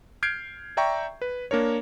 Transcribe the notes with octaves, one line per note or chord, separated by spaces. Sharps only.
F6 G6 G#6 C7 D7
D5 E5 G5 A#5 C#6
B4
A#3 D4 A#4 C#5